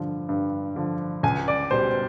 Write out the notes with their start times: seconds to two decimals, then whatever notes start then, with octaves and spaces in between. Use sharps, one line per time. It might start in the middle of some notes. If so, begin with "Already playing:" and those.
Already playing: G2 D3 F3
0.29 G2
0.76 D3 F3
1.23 C#2 G#5
1.48 D5
1.71 B2 G3 C5